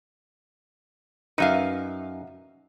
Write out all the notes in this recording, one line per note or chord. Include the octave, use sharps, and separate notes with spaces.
F#2 D#4 B4 E5 F5